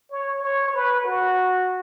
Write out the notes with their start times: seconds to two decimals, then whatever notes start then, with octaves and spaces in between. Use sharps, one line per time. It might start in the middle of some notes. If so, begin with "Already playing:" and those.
0.11 C#5
0.41 C#5
0.73 B4
1.04 F#4